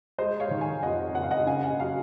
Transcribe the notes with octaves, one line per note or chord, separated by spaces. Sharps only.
G#3 C5 D#5
C#5 F5
D#3
F5 G#5
F2 D#5 F#5
F#1 F#5
F5
D#5 F#5
C#3 F5 G#5
D#5 F#5
F#3 F5 G#5